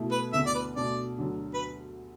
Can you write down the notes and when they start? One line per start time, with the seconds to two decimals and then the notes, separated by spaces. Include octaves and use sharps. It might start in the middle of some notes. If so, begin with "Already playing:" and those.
Already playing: B2 A3 E4
0.11 B4
0.33 D2 D3 B3 D4 E5
0.46 D5
0.54 B4
0.75 B2 A3 D4 D5
1.18 D2 D3 F#3 D4
1.54 B4